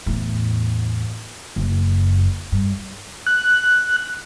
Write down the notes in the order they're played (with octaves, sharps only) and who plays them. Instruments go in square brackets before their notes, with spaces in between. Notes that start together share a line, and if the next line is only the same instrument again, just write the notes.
[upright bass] E2 A2
F#1 F#2
G2
[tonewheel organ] F#6